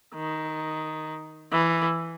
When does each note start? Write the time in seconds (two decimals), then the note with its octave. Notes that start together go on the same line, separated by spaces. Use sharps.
0.14 D#3
1.52 E3